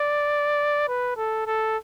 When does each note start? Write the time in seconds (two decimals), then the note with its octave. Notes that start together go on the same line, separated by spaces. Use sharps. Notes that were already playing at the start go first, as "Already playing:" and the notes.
Already playing: D5
0.88 B4
1.17 A4
1.46 A4